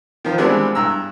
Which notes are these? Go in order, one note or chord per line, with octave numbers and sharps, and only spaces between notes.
D#3 F3
E3 G3 G#3 B3 C4 D4
G2 A#5 E6